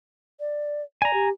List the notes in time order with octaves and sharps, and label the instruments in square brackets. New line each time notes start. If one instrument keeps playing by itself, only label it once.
[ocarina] D5
[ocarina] D5 [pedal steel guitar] G#5 A#5
[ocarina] G4